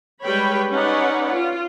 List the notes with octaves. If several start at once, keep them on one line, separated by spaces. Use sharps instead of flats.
G3 G#3 B4 C#5 G5 B5
C#4 D#4 B4 C#5 D5 F#5
F4